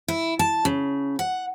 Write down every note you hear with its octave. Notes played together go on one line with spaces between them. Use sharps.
E4
A5
C#3
F#5